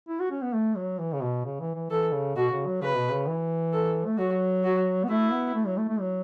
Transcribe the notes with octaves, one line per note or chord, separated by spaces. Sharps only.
E4
F#4
C#4
B3
A3
F#3
E3
C#3
B2
C#3
E3
E3
E3 A4
C#3
B2 F#4
C#3
F#3
C#3 B4
B2
C#3
E3
A4
A3
F#3 F#4
F#4
B3
A3 E4
B3
A3
F#3
A3
A3
F#3